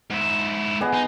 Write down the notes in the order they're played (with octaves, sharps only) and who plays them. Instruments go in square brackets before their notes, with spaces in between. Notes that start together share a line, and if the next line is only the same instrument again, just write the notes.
[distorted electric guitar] G#2 E4
[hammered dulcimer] B3 G#4 D#5
[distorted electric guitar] D#4 [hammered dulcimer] C6